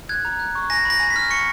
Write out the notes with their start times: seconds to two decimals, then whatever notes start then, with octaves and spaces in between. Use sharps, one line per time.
0.09 F#6 G#6
0.25 A#5
0.40 F#6
0.55 C#6
0.70 G#5 A#6
0.85 B5 A#6
1.00 G#5
1.10 B6
1.16 F6
1.30 C#6 C#7